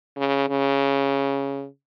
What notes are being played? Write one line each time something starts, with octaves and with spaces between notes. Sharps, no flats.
C#3
C#3